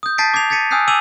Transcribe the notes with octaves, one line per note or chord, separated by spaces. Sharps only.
D#6 G6
A5 G6 A6 B6 C7 D7
D6 G#6 B6 C7 F7
G#6 A6 B6 C#7 D#7
G#5 D#6 E6 F#6 G6 C7
G#5 D6 E6 D#7 F7 F#7